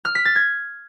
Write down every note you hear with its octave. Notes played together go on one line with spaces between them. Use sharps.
F6
B6
A6
G#6